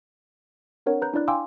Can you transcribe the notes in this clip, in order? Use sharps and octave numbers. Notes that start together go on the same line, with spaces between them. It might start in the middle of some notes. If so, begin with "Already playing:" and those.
C4 D4 A#4 C#5 F#5
B4 A#5 F#6 G6
D4 E4 D5 F#6
F5 G5 G#5 C6 D6 E6